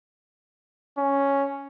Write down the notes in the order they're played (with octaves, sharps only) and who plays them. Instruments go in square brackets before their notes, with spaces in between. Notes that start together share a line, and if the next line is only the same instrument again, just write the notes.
[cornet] C#4